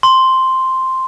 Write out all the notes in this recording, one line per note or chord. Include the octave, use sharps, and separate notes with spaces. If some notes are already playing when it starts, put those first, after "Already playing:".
C6